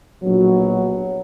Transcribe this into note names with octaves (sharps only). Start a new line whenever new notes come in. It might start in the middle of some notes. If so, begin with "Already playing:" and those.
A#1 B2 F#3